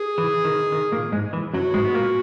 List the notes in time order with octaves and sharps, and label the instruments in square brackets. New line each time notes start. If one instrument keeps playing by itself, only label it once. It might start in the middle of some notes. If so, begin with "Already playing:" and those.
Already playing: [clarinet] G#4
[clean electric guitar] E3
D#3
D#3
A#2 A#3
G#2 G#3
E3
[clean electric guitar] F#2 F#3 [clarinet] F#4
[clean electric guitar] G#2 G#3
B3
A#2 A#3